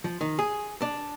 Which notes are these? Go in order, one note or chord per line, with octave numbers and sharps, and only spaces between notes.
F3
D#3
G#4
D4